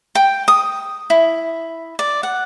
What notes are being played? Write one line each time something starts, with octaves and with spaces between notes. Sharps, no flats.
G5
D#6
E4
D5
F#5